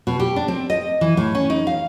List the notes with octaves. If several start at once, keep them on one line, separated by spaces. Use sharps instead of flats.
B2
G4
D4
C4
D#5
E3
A2
C#4
D#4
F5